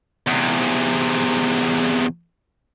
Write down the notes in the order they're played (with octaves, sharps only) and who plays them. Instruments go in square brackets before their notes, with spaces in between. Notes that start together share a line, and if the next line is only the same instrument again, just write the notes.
[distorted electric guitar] E2 C3